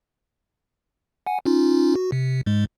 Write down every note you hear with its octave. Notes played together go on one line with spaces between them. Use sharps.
F#5 G#5
C#4 D#4 F4
F#4
C3
G#2 G#3